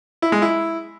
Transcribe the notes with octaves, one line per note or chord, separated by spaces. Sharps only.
E4
G#3
E4